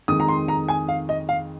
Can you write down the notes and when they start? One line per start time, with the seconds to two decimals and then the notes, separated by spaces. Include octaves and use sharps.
0.08 F2 D#3 G#3 D#6
0.20 A#5
0.28 C6
0.48 A#5
0.68 G#5
0.88 F5
1.09 D#5
1.29 F5